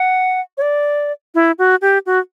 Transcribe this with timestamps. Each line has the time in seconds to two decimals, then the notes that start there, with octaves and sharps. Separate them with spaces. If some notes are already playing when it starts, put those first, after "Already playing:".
Already playing: F#5
0.58 C#5
0.62 D5
1.35 E4
1.59 F#4
1.82 G4
2.06 F#4